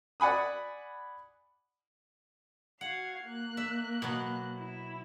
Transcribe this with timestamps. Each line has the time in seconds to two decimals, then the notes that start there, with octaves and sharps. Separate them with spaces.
0.20 D5 F#5 G#5 B5 D#6
2.81 F#4 F5 F#5 G#6
3.23 A#3 F#6
3.57 E5
4.02 B2 F#3
4.58 E4